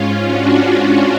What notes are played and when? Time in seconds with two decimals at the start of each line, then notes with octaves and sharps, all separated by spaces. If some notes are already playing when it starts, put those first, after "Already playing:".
Already playing: G#2 C#4 F4
0.27 D4 F#4